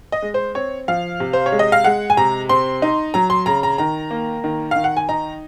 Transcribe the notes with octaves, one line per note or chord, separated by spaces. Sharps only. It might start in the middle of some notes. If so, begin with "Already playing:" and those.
D#5
G#3
C5
C4 C#5
F3 F5
C3
C5
C#5
G#3
D#5
F5
G#3 F#5
G#5
C3 A#5
C4 C6
D#4
F#3 A#5
C6
C#3 A#5
A#5
D#3 A#5
A#3
D#3
D#3 F5
F#5
G#5
D#4 A#5